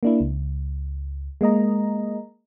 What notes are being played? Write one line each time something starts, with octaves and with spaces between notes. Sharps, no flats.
A#3 D4 E4
C#2
G#3 A#3 D#5 A#5